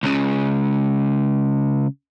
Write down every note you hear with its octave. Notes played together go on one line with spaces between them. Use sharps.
C#2 C#3